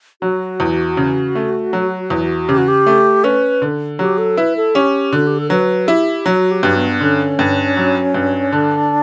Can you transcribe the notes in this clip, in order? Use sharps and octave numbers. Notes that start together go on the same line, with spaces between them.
F#3 F#4
E2
C#3
A3
F#3
E2
C#3 G4
F#4
G4
A3
C#4 B4
D3
F#3 G4
A4
E4 B4
A4
C#4 G4
D3 F#4
G4
A4
F#3 B4
E4 G4
F#3 F#4
G4
G2
B3
D3 C#4
G2
F#3
G2
D3 D4